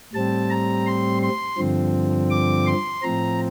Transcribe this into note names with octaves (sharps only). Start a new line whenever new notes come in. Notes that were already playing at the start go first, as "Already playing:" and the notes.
A2 G3 C4 A5
A#5
C6
C6
G2 D3 F3 C4
D6
C6
A2 F3 C4 A#5